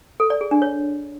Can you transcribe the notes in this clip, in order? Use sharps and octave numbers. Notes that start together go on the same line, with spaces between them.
A4
D5
G#4
D4
C#5